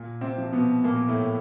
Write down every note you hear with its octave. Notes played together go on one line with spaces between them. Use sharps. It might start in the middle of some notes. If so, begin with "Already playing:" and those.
Already playing: A#2
C3 C4
F3
B2 B3
A#2 A#3
A2 A3